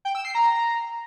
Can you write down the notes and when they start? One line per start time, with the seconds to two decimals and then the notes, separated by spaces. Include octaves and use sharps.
0.05 G5
0.15 E6
0.25 C7
0.35 A#5